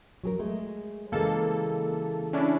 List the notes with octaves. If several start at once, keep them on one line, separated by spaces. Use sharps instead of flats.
F#3 G#4 A#4
G#3 A3
C#3 E3 G#3 A#3 A4
C#4 D4 E4